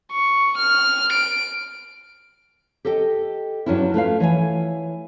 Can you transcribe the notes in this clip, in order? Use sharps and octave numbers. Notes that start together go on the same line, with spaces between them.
C#6
F6
D7
G4 A4 D#5 G5
G2 F#3 C#4 D4 E4
A3 F4 B4 F5
E3 C#5 G#5